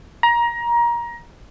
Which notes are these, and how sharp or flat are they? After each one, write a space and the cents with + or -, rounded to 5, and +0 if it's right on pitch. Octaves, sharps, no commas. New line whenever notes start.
A#5 +20